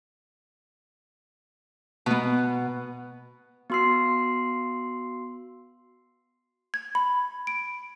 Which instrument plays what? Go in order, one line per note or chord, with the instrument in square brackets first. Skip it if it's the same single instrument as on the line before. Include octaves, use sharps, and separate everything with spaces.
[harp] B2 B3
[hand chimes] B3 F#4 C6 E6 C7
[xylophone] G#6
B5
D7